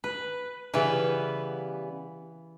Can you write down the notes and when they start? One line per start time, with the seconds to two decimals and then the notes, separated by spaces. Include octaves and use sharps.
0.04 B4
0.74 C#3 E3 G3 B3 B4